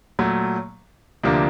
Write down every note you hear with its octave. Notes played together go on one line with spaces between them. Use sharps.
A#2 F#3 A3
D2 C3 F3 A#3 D4